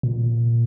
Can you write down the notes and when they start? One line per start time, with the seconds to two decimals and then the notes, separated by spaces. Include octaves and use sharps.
0.03 A#2